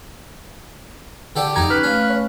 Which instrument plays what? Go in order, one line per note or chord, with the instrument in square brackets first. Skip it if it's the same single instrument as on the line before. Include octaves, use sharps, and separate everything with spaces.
[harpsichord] D3 G4 A4
[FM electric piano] F2 A#5 G#6 [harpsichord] D#4 G4
[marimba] C#4 [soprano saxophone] B4 [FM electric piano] F6
[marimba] A3 F5 [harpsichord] C#4
[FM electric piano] C#5